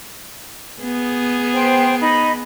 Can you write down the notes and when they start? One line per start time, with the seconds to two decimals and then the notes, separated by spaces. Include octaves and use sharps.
0.83 B3 G#4
1.53 C5 G5
2.01 D#4 B5